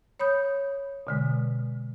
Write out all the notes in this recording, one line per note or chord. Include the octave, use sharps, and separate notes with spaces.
C#5 B5 D#6 G6
B2 D3 G#3